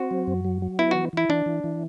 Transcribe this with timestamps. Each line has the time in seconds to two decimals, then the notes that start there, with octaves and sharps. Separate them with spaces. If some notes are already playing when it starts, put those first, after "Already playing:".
Already playing: C4 F#4
0.11 F#3
0.27 F#2
0.44 F#3
0.62 F#3
0.79 B3 E4
0.91 E3 F#4
1.13 E3 E4
1.29 E3 D4
1.46 E3
1.64 E3